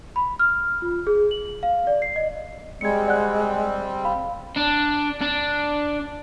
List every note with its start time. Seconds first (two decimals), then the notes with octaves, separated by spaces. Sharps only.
0.16 B5
0.39 F6
0.82 F4
1.07 G#4
1.31 F#7
1.63 F5
1.87 D5
2.02 C7
2.16 D#5
2.81 G3 G#3 C4 G#6 C#7
3.08 D5 F#5 F#6
4.05 F5 B5
4.56 D4
5.22 D4